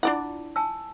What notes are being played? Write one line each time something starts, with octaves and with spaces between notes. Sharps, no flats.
D4 E4 F4 D5 F#5
G#5 A5 E6